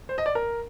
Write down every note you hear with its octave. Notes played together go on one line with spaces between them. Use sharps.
C5
D#5
D5
A#4